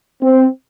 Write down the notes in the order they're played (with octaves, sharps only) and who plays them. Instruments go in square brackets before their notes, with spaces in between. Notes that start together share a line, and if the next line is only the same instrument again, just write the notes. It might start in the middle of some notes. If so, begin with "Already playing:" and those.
[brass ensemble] C4